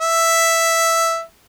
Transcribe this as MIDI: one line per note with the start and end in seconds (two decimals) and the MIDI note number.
0.01 1.22 76